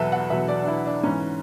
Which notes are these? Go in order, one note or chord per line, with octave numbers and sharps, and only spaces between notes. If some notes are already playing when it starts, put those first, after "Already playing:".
Already playing: E2 B2 F#3 A4 B4 E5
F#5
E2 B2 F#3 E5
D5
D4
E4
D4
G#2 E3 C#4